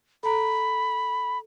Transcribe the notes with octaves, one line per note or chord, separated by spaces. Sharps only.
A4 A#5 B5